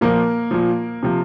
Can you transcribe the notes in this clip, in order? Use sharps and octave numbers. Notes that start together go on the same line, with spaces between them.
A#2 F3 A#3 A#4
A#2 F3
C3 F3